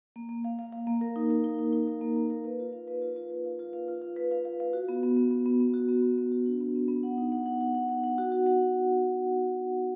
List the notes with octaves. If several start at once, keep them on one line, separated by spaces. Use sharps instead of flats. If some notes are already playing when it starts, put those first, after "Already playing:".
A#3
A#3
F5
F5
F5
A#3
A#4
D#4
A#4
D#4
D#4
D#4
A#4
A#3
A#3
A#4
B4
F4
F5
B4
F4
F4
F4
F5
F4
F5
F4
F5
B4
F5
F5
F5
F#4
B3
B3
B3
B3
B3
B3
F#4
B3
B3
B3
F#4
D4
B3
B3
B3
F#5
D#4
F#5
F#5
F#5
F#5
F#5
F#5
F#4
F#4
F#5